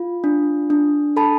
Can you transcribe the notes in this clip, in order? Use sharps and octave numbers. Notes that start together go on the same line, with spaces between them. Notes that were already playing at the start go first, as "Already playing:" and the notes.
Already playing: F4
D4
D4
A4 A5 B5